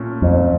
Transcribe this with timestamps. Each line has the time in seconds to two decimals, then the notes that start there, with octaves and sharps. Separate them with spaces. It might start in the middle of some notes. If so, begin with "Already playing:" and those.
Already playing: A#2 A3 C#4
0.22 F2